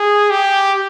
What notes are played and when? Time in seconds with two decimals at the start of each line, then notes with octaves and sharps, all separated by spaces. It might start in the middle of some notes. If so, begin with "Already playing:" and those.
Already playing: G#4
0.30 G4